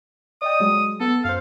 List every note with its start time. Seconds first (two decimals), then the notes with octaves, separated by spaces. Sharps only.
0.42 D5 D#5 G5 D#6
0.60 F#3 G#3
1.00 B3 A4
1.24 F#2 C5 F5